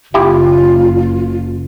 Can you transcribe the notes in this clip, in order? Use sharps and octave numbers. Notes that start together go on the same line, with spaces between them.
F#1 E4 F4 G4